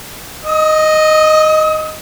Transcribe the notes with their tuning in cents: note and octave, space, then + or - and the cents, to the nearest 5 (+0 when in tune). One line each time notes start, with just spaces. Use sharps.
D#5 +0 D#6 +40